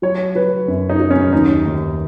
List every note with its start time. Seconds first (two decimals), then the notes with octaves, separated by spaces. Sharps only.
0.02 F#3 C#5
0.35 F#3 B4
0.68 F#2
0.90 D#4
1.00 F#3
1.10 C#4
1.33 D#2 D#4
1.65 D#2